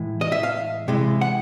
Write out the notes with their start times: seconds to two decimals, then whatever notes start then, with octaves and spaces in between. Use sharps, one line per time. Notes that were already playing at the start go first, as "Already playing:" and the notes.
Already playing: A2 E3 G#3
0.21 D#5
0.32 E5
0.43 F5
0.88 C3 E3 G#3
1.21 F#5